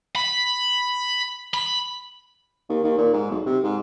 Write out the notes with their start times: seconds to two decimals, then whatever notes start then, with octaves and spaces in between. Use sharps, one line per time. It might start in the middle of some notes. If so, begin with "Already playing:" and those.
0.16 B5
1.54 B5
2.69 D#2
2.84 D#2
2.98 A#2
3.13 G#2
3.31 B1
3.46 C3
3.63 G#2